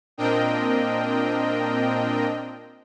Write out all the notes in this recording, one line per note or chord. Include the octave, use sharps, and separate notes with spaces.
A#2 C4 D4 A#4 D#5 G5